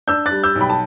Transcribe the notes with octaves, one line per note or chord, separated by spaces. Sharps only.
D4 E6 G6
F#6 A6
G3
E6 G6
B1
G5 B5
A5